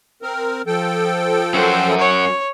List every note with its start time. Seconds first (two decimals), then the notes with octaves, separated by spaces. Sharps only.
0.22 C4 A#4
0.67 F3 A4 G5
1.54 F#2 F#4 C5
1.98 C#5